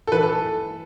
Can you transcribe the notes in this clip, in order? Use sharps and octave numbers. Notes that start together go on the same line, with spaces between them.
A4
E3 B4
A4